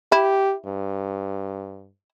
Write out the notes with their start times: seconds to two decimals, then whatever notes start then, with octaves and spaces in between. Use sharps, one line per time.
0.12 E4 G4
0.66 G2